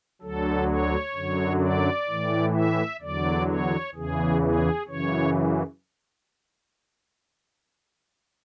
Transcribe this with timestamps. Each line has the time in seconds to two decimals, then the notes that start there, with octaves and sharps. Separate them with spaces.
0.22 D2 D3 F#3 A4
0.69 C#5
1.15 F#2 D3 F#3
1.62 D5
2.08 A2 E3
2.54 E5
3.01 E2 D3 F#3 D5
3.48 C#5
3.95 E2 C#3 E3 G#4
4.41 G#4
4.88 F#2 C#3 E3 C#5